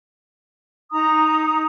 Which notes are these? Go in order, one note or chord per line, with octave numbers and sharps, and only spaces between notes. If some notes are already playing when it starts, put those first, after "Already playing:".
D#4 A#5 D#6